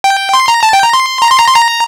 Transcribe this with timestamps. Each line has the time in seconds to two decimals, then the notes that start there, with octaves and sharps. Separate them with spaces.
0.04 G5
0.34 C6
0.48 A#5
0.63 A5
0.73 G5
0.83 A#5
0.93 C6
1.22 A#5
1.31 C6
1.39 A#5
1.48 C6
1.55 A#5